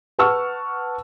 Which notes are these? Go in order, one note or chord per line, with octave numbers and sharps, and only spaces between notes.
B4 F#5 A5 C#6 E6 F6